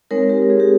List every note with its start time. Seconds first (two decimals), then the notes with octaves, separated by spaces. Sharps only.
0.11 G#3 C4 D#4 A#4 C#5
0.29 G4 A#4
0.50 G#4
0.60 G4